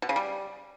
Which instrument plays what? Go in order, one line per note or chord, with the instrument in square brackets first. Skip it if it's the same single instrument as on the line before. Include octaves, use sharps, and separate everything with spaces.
[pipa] B2
C#3
G3